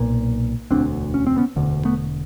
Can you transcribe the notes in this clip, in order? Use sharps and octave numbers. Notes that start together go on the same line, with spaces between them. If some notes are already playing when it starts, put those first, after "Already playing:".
Already playing: B1 A#2
E1 D2 D3 C4 D4
C#4
C4
B3 C#4
E1 D2 D3
A3 B3